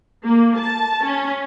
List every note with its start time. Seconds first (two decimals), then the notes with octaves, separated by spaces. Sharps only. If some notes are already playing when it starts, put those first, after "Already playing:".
0.25 A#3
0.58 A5
1.05 C#4